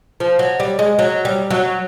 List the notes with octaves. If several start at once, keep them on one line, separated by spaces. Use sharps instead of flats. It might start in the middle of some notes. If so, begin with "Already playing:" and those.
F3
F#3
G3
G#3
F#3
G3
F#3